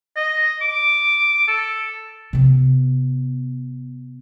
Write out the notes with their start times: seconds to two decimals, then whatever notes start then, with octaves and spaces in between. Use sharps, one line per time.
0.16 D#5
0.61 D6
1.48 A4
2.33 C3 B3